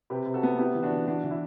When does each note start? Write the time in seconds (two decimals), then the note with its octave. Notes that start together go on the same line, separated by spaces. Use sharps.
0.10 C3 G4 B4
0.26 C3
0.34 F#4 A4
0.43 B3
0.58 B3 E4 G4
0.75 E3
0.83 D4 F#4
0.91 E3
1.07 E3 D4 F#4
1.24 E3
1.31 E4